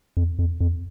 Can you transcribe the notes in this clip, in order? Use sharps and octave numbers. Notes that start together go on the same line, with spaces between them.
F2
F2
F2